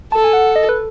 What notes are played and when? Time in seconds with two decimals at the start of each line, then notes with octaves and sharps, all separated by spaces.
0.12 A4 A5
0.24 G#5
0.33 F#5
0.56 D#5
0.69 B4